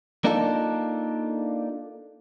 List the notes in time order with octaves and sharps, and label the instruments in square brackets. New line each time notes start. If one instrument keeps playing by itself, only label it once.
[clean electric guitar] A#3 D4 D#4 F4 A4